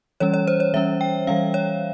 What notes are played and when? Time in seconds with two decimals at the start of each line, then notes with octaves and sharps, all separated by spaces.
0.20 E3 G3 C#4 C#5
0.34 C#5
0.47 C5
0.60 C#5
0.74 E3 G3 C#4 E5
1.01 G5
1.27 E3 G3 C#4 F5
1.54 C#5